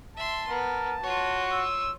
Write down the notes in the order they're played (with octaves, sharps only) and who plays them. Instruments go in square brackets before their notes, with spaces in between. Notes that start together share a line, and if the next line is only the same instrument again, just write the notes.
[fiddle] E5 C6 [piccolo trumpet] A5
[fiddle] B3 [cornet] A#4
[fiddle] F4 C#5 [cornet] F#4
[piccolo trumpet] E6